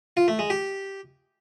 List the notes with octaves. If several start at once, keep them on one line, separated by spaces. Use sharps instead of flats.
F4
A3
G#3
G4